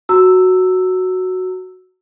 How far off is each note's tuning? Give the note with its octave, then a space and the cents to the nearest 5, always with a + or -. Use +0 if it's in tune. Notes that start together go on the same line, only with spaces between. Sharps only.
F#4 +0 A#5 -35 E6 +0